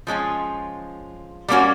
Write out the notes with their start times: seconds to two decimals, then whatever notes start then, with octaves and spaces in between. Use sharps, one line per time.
0.07 F3 G#3 C#4 F4
1.48 G3 A#3 C#4 F#4